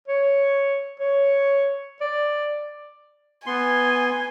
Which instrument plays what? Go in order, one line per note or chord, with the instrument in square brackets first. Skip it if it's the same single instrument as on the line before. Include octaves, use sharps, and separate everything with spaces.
[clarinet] C#5
C#5
D5
[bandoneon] B3 C6 [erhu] G#5